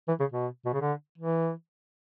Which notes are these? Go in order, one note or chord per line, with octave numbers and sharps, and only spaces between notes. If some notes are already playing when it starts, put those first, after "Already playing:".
E3
C#3
B2
B2
C#3
D3
E3